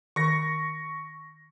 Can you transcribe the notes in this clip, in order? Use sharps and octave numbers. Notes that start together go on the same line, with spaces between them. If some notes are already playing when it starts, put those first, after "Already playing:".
D#3 C#6 A#6